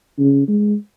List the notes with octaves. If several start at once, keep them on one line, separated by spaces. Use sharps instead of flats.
C#3
G#3